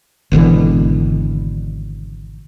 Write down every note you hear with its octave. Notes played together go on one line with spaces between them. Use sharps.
G#1 B2 D3 E3